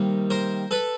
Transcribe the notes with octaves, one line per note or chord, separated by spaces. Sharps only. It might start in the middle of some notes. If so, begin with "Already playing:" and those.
Already playing: C3 D#3 G3 A#3
A#4 C5
A4 B4